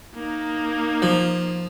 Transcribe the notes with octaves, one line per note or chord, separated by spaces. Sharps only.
A#3 D#4
F3